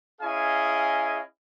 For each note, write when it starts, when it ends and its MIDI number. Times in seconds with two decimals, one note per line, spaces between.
0.21 1.21 61
0.21 1.21 64
0.21 1.21 68
0.21 1.21 75
0.21 1.21 77
0.21 1.21 80